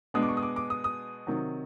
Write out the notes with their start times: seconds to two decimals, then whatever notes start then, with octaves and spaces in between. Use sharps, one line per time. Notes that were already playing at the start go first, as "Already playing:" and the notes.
0.14 B2 G#3 B3 D4 D#6
0.22 D6
0.29 C#6
0.37 D#6
0.43 D6
0.56 D6
0.70 D#6
0.84 D#6
1.27 C3 D#3 F#3